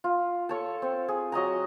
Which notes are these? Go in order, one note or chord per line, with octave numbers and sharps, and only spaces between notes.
F4
A4 C#5 A5
C4
G#4
F#3 D#5 G#5 A#5